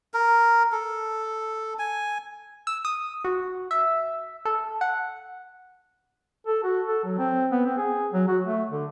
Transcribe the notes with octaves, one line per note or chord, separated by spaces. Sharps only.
A#4
A4
G#5
E6
D#6
F#4
E5
A4
F#5
A4
F#4
A4
F#3
C4
B3
C4
G#4
F#3
F#4
A3
D3